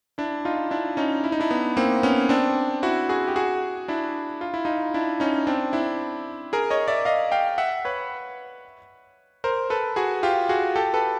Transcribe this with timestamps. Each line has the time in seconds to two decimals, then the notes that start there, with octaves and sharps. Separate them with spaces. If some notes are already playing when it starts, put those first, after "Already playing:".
0.18 D4 E4
0.45 D#4 F4
0.71 D4 E4
0.97 C#4 D#4
1.24 E4
1.32 D#4
1.40 D4 E4
1.51 B3
1.77 A#3 C4
2.03 B3 C#4
2.29 C4 D4
2.83 E4 F#4
3.09 F#4 G#4
3.28 G4
3.36 F#4 G#4
3.88 D4 E4
4.41 F4
4.54 E4
4.65 D#4 F4
4.94 D4 E4
5.20 C#4 D#4
5.47 C4 D4
5.73 D4 E4
6.53 G#4 A#4
6.70 C#5 D#5
6.88 D5 E5
7.05 D#5 F5
7.32 F5 G5
7.58 E5 F#5
7.85 B4 C#5
9.44 A#4 C5
9.70 A4 B4
9.96 F#4 G#4
10.23 F4 G4
10.49 F#4 G#4
10.75 G4 A4
10.94 A4 B4